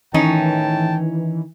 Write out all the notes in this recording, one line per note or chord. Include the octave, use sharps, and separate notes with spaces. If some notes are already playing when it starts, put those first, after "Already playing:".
A2 D#3 E3 C#4 D#4 G5 A5